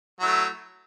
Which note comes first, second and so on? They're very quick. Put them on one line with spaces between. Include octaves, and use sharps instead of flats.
F#3 E4 A3